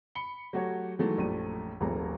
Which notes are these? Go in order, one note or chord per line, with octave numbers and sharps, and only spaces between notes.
B5 C#7 G7
F#3 A3 F#4 G4 C#5
D#3 E3 F#3 G#3 A3
A#1 F#2 G3 A3 D#7
D#1 G#1 F3 G#3 A3 A#5